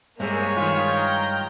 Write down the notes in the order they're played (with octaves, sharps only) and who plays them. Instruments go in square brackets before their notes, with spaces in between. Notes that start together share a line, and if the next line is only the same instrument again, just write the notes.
[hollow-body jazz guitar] G2 G#3 [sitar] C3 [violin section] A#3 G#4 [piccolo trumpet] C#5
[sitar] D#3 F4 [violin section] G#4 B6
[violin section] G5 A#5 G6